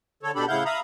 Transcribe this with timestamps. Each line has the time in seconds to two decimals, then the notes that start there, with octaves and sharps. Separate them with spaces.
0.23 D3 A4 C#5
0.35 B2 D4 G4 A4 B5
0.48 A2 C#3 E4 F5 F#5 G6
0.65 E5 F5 A#5 B5 D#6